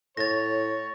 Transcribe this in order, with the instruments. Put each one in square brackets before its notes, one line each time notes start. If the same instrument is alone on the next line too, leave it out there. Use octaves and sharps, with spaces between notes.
[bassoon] A2 [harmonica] C#5 [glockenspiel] A6 A#6